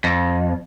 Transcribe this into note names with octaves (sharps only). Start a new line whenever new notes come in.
F2